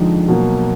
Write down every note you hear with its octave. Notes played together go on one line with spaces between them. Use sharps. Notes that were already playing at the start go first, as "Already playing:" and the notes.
Already playing: F2 D3 F3 G#3 D#4
B2 F#3 A#3